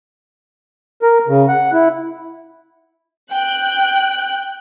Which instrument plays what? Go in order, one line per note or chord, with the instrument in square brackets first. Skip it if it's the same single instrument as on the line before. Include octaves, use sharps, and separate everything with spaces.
[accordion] A#4
C#3
F#5
E4
[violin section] G5 F#6